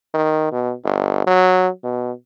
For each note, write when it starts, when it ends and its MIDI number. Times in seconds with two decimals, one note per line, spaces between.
0.14 0.49 51
0.52 0.74 47
0.84 1.24 31
1.27 1.68 54
1.84 2.12 47